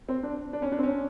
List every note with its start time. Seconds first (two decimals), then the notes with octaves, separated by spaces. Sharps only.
0.09 C4
0.23 D4
0.53 D4
0.62 C#4
0.72 D4
0.79 C4
0.83 C#4